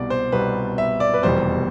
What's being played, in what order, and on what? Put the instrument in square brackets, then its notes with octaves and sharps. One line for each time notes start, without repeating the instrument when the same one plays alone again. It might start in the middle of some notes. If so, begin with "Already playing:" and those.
Already playing: [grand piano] C2 B2 G3 D5
C5
C2 B2 G3 B4
E5
D5
B4
F1 E2 B2 G3 C5